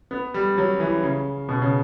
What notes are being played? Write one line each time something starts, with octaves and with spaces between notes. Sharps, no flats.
B3
G3
F#3
E3
C#3
B2
C#3